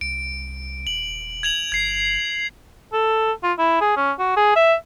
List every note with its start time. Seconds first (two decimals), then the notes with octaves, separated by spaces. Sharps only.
0.01 C2 D7
0.87 D#1 F#7
1.43 G#6 F7 F#7
1.72 G1 G#6 C7
2.93 A4
3.43 F4
3.59 E4
3.81 G#4
3.96 C#4
4.19 F#4
4.37 G#4
4.56 E5